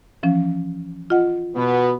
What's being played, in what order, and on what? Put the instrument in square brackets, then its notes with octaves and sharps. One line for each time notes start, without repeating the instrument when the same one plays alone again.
[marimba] E3 F3 C#4
F4 D#5 F#5
[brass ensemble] B2 B3